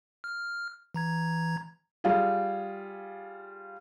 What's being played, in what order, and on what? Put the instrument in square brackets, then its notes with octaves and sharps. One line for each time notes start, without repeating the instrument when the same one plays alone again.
[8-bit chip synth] F6
E3 A#5 G#6
[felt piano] G3 F4 G#4